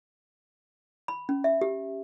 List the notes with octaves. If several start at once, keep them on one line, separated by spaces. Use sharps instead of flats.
B5
C#4
E5
G4